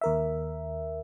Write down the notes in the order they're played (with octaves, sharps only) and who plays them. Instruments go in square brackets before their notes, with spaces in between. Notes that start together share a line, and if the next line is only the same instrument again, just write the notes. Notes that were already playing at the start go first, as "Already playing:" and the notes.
[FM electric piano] D#2 A#4 E5